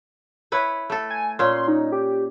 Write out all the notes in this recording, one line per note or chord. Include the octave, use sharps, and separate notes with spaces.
E4 B4 C#5
A3 A4
G#5
A#2 C#4 C6
D#4
G4